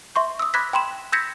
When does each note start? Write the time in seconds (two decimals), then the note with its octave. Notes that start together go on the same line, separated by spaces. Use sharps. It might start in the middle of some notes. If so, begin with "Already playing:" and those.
0.15 E5 C6 C#6 G6
0.39 D#6 E6
0.54 B5 D6 F#6 G#6 A#6 B6
0.73 G5 B5 C6 E7
1.12 E6 G6 G#6 A#6 B6 C#7